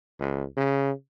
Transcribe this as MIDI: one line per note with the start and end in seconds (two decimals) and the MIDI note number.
0.19 0.44 37
0.57 0.91 49